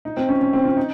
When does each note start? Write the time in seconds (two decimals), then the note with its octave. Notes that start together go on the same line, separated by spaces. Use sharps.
0.05 D#4
0.17 C4
0.29 C#4
0.41 C#4
0.53 C4
0.65 C#4
0.77 D#4